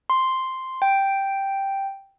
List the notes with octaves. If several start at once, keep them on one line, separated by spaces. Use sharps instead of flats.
C6
G5